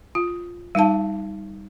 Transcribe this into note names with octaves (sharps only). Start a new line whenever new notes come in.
F4
G3 D#4 F5 A5